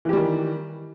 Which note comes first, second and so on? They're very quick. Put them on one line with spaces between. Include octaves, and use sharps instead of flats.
E3 G4 G3 D#3